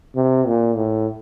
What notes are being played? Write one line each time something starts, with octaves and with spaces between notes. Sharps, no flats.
C3
A#2
A2